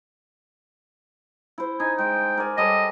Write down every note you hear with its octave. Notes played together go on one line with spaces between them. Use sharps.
E4 C5
D#4 G#5
G#3 G5
A#4 D5 G#5
G3 A4 C#5 D#5